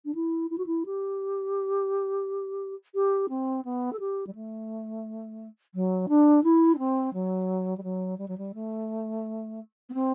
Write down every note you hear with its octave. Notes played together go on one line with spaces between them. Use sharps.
D4
E4
E4
F#4
E4
G4
G4
C4
B3
A4
G4
G3
A3
F#3
D4
E4
D4
C4
F#3
G3
F#3
G3
F#3
G3
A3
B3
C4